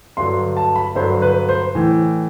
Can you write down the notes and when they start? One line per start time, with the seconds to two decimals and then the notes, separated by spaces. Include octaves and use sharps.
0.17 G2 D3 F#3 C6
0.57 A5
0.76 B5
0.95 G2 D3 F#3 C5
1.22 B4
1.49 C5
1.75 A2 E3